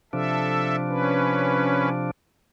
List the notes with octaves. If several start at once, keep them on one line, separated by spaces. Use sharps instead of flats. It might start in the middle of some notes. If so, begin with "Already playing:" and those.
C3 F3 D4 A4 E5
C#4 B4